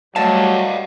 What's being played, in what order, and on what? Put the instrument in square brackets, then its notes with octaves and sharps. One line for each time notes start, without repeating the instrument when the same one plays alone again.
[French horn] F#3 [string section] G3 A3 G4 [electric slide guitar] D5 D#5 F5 [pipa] A5